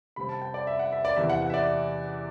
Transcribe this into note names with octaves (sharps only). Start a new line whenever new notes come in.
C3 G3 C4 B5
A5
G5
D5
E5
F#5
E5
D5
E2 C3 E3 E5
F#5
F#5
E5
D5